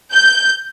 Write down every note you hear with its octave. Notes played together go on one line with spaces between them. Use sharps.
G6